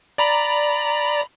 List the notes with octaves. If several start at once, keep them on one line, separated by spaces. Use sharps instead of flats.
D5 A#5 B5